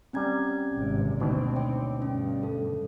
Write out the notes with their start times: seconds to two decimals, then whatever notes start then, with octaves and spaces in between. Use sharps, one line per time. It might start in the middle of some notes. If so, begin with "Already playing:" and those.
0.13 G3 C4 C#4 G#5 A#5 G#6
0.75 G#1 C3
1.20 D2 B2 C4 D#4
1.56 C#5 G5 D6
2.02 G2 C#4
2.43 A4